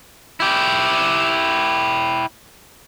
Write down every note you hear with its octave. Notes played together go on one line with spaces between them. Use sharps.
E4 G4